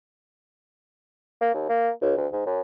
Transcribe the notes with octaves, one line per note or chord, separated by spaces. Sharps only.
A#3
D#2
A#3
C#2
D2
G#2
F#2